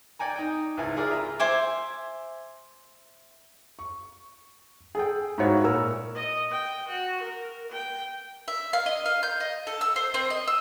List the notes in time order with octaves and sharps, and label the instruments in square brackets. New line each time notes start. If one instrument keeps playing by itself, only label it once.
[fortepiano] D5 G5 G#5 A#5
D#4 G5
C#2 G#2 E4 G#5
E4 F4 G#4 A#4 D5
F4 E5 A#5
[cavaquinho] C5 E5 G#5 D6
[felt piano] C#6
G#4 A4 G5
G#2 E4 F#4 C#5 F5
A#2 A#4 E6
[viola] D#5
G5
F#4
A#4
G5
[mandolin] E5
F5
D#5
F5
G6
D#5
A4
E6
C5
C4
D#5
E6